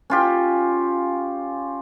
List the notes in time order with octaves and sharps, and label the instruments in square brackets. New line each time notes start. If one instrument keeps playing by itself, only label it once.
[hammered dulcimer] C#4 F4 G4